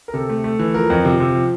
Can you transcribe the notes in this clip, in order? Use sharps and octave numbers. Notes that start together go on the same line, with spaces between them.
A#4
C3 A4
A3
A3
E3
F3 A#4
F2
C3 F4
C3
F3